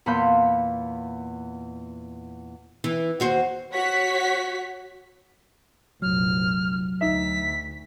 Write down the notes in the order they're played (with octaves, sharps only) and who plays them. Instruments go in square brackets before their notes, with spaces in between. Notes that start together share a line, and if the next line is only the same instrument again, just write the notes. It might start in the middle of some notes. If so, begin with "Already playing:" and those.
[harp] E2 A#2 F5 B5 C6 G6
[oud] E3
D#2 F#4 C5
[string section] F#4 C#5 F#5 B6
[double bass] F1 A#1 [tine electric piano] F#3 [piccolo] F6
[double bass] D2 [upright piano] D#4 E5 [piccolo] B6